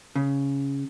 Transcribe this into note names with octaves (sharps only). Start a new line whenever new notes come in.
C#3